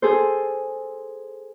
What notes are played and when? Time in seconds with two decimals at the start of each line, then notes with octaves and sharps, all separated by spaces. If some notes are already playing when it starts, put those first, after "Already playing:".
0.02 G#4 A4 C5